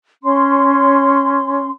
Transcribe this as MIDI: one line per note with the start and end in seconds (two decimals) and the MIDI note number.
0.23 1.69 61
0.23 1.69 84